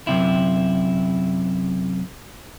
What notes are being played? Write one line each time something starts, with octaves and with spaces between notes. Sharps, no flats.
F#2 C3 E4